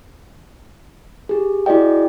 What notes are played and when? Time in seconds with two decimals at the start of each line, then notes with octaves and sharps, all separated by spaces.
1.29 G4 G#4
1.66 E4 F#4 G#4 D5 D#5 G5